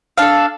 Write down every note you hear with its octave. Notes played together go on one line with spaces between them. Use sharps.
D4 A4 F5